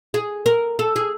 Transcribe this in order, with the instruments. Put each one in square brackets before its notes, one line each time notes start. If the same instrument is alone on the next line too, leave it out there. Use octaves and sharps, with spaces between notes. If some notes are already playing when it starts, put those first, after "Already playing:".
[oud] G#4
A#4
A4
G#4